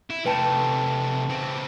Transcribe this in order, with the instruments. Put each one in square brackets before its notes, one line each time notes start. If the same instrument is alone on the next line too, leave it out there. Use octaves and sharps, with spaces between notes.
[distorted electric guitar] E4
[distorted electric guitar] C3 A3 [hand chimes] B4 G5 A5
[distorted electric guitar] C#3 C4